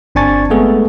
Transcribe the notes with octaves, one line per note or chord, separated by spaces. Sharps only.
G1 C4 D4 G#5 C#6 A6
G#3 A3 B3 G#4 A4